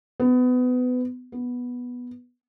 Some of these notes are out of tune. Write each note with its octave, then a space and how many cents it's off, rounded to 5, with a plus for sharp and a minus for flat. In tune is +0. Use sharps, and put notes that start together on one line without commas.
B3 +25
B3 -5